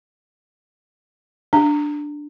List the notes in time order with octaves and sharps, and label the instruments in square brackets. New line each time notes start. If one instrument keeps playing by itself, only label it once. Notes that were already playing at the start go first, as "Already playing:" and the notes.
[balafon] D4